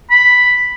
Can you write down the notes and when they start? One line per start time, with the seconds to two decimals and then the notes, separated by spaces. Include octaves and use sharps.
0.11 B5